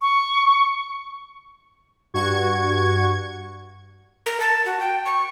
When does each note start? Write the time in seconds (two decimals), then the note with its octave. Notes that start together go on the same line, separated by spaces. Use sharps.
0.02 C#6
2.14 G2 F#4 C#6 G#6
4.26 A#4
4.40 A5
4.66 F#4
4.80 G5
5.06 C#6